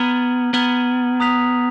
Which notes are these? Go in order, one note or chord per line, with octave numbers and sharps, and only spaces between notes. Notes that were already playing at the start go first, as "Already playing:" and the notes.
Already playing: B3 A#5 F6 G#6 D#7 F#7
B3 A#5 F6 G#6 D#7 F#7
A#5 D#6 F#6 B6 F7